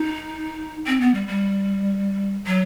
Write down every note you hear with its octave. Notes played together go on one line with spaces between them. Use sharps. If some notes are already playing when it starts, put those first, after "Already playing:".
Already playing: D#4
C4
B3
G3
G3
F#3